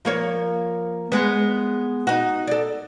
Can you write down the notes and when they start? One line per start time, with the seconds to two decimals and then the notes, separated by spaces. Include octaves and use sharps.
0.05 F3 A#3 C#5
1.12 G#3 B3
2.07 D#4 F#4
2.47 A4 D5